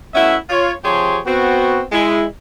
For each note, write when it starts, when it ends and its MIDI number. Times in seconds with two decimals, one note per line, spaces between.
0.14 0.36 47
0.14 0.36 57
0.14 0.36 61
0.14 0.36 64
0.14 0.36 76
0.14 0.36 78
0.50 0.72 65
0.50 0.72 73
0.84 1.19 48
0.84 1.19 53
0.84 1.19 67
0.84 1.19 68
0.84 1.19 73
0.84 1.19 84
1.26 1.83 59
1.26 1.83 60
1.26 1.83 66
1.92 2.25 56
1.92 2.25 64